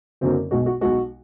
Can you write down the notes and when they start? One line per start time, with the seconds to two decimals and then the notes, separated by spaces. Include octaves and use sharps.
0.21 F#1 F#2 D3 F#3 A#3 C4
0.51 B1 B2 G#3 F#4
0.66 F#4
0.81 B1 B2 G#3 F#4